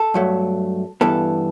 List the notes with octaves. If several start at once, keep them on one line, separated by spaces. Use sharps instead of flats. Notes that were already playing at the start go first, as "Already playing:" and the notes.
Already playing: A4
G2 F#3 A3
G2 E3 B3 A4